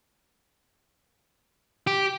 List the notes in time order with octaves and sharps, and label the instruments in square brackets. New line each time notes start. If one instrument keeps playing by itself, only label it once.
[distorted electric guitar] G4